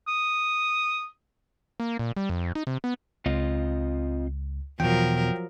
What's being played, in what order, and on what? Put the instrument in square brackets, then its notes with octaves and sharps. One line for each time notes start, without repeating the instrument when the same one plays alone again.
[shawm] D#6
[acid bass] A#3
A#2
G3
F2
D#4
C3
B3
[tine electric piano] C#2 [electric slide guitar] C4 F4 D#5
[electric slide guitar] E2 B2 [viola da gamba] F3 F#3 A#4 [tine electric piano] G5